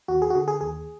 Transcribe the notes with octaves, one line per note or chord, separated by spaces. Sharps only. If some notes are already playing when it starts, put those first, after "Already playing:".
D#2 F#4
G#4
F#4
D3 G#4
G#4
D#2 G#4